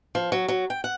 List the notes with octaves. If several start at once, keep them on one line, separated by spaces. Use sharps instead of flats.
F3
F#3
F#3
G5
F#5